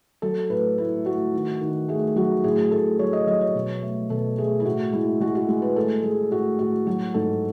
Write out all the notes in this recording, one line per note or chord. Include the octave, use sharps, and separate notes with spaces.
F#3 A4
A2 B4
A3 E4
A3 F#4
D#3
D#3
A3 G#4
F#3 F#4
A2 G#4
A2 A4
F#3 C#5
D#5
F#3 D#5
C#5
B2
A3
B2 A4
A3 G#4
E4
A2 F#4
G#3 E4
G#3 F#4
F#4
G#3
B4
A2 A4
G#3 G#4
A2 F#4
A2 F#4
F#3 F#4
G#2 A4